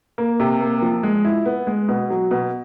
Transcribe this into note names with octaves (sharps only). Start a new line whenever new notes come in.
A#3
C3
A#3
F3
G#3
E4
B3
G#3
B2
F#3
B2